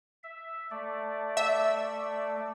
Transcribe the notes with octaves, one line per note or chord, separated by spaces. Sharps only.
E5
A3 D5
E5